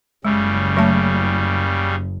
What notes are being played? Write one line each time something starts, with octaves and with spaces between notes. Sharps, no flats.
F#1 C#3 G3 G#3
F#3 A3 A5